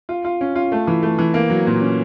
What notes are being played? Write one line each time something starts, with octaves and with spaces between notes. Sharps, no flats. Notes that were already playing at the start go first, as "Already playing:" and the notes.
F4
F4
C#4
F4
A3
E3
A3
E3
A#3
F#3
A#2
C#4